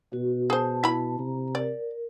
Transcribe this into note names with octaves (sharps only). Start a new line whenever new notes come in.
B2 F#4
G#4 C5 A5
E4 B5
C3 A#5
A#4 D5